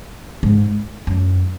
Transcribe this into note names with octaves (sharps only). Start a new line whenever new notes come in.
G#2
F#2